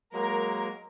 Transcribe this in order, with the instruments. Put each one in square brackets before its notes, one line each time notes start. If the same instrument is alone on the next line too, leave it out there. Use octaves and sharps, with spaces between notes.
[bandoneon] F#3 G#3 A#3 [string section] A#4